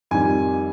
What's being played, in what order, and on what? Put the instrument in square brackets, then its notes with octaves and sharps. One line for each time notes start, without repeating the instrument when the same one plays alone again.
[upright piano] F2 D#3 G3 G#5